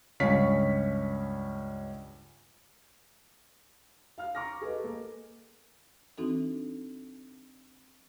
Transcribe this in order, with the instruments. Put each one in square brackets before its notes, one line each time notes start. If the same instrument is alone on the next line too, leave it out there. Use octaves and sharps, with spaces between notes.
[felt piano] C#2 G2 C#4 F5 C#6 B6
F5 F6
A#5 C#6 D6 F6 A#6
G#4 A4 B4 D#5
A#3
[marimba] E3 C4 D4 D#4 F#4 A4